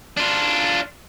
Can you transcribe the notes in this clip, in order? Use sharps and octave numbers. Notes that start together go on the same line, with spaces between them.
D4 F4